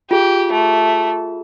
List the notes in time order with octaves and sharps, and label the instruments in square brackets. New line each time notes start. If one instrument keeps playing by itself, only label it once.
[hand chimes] F4 G#4 [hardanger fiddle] G4
[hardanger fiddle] A3